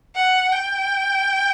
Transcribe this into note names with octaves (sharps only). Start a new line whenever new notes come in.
F#5
G5